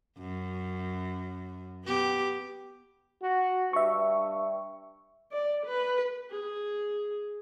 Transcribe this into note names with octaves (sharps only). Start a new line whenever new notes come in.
F#2
B3 G4
F#4
G2 E5 C#6
D5
B4
G#4